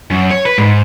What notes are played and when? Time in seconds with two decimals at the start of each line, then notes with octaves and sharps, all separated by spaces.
0.11 F#2
0.31 C#5
0.46 B4
0.58 G#2